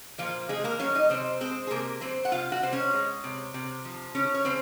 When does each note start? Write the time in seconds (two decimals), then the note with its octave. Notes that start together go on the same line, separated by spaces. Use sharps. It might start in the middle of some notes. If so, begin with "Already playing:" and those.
0.18 A#2 F3 F4
0.49 C3 G#3 G#4
0.64 A#3 A#4
0.79 F#3 C#4 C#5
0.95 D#4 D#5
1.10 C3 C4 C5
1.41 G#3 C4 C5
1.67 G#4
1.71 C3 A#3 A#4
2.01 F#3 C4 C5
2.25 F#5
2.32 C3 F4 F5
2.52 F#4 F#5
2.62 C3 C5
2.73 C#4 C#5
2.94 G#3
3.24 C3
3.54 C3
3.85 F3
4.15 C#3 C#4 C#5
4.34 C#5
4.45 C#3 C4 C5